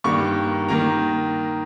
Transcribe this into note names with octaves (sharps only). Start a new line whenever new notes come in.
G2 D#3 G3 A#3 C#6
D#3 A#3 A#5